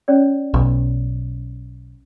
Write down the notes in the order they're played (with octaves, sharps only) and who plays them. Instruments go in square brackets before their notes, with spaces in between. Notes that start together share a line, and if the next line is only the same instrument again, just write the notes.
[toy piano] C#4 C#5 D5
[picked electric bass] B1